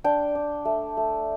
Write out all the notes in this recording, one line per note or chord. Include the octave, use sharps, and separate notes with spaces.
D4 G5
D4
A3
A3